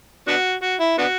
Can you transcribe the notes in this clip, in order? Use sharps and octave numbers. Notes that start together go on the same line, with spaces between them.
B3 D4 F#4
F#4
E4
B3 D4 F#4